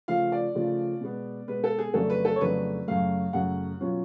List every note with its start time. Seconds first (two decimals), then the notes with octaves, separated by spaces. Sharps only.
0.08 C#3 F3 A3 F4 F5
0.32 D5
0.55 C#3 F3 A3 F4
1.01 B2 G#3 B3
1.48 B2 G#3 B3 B4
1.64 A4
1.78 G#4
1.94 F2 C#3 F#3 A3 D4 A4
2.10 B4
2.25 A4
2.36 C#5
2.41 F2 C#3 F#3 A3 D4 B4
2.87 F#2 C#3 F#3 A3 F5
3.33 F#2 C#3 F#3 A3 F#5
3.81 B2 F#3 C#4 F4